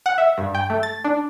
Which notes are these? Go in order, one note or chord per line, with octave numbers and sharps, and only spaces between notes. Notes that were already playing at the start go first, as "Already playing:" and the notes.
F#5
E5
G2
G5
A3
A6
D4